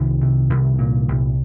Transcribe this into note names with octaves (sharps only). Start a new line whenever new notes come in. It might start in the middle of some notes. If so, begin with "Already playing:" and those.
Already playing: C2 D#3
C3
C2
A#2
C2